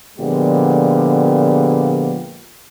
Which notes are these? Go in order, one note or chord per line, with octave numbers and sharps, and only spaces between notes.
A#2 D3 F3 G#3 B3 G4